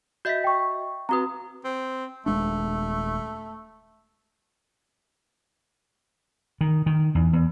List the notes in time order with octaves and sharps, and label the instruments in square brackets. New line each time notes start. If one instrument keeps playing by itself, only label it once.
[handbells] F#4 D#5 E5 [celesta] G6 B6
[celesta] G5 C#6
[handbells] C4 F#4 B4 [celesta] A#5 D#6
[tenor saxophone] C4
[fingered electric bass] D#1 G#3 D4 [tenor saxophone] A3
[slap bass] D#3
D#3
E2
E2